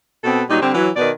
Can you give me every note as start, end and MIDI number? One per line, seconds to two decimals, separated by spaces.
0.24 0.42 47
0.24 0.42 59
0.24 0.42 60
0.24 0.42 69
0.49 0.57 46
0.49 0.57 54
0.49 0.57 55
0.49 0.57 63
0.61 0.73 50
0.61 0.73 55
0.61 0.73 60
0.74 0.89 52
0.74 0.89 54
0.96 1.10 47
0.96 1.10 51
0.96 1.10 71
0.96 1.10 74